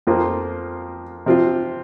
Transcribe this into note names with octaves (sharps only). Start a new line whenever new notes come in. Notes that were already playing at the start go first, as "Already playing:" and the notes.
F2 F3 A#3 F4
C3 F3 C4 F4